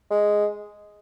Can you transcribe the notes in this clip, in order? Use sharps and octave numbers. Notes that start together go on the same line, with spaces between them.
G#3